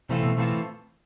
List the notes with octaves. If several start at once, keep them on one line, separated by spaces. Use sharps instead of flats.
C3 E3 A3 C4 F4 A4
B2
E3 A3 C4 F4 A4